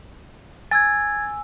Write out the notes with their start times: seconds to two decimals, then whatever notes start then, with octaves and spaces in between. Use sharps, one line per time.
0.71 G#5 E6 G#6 A6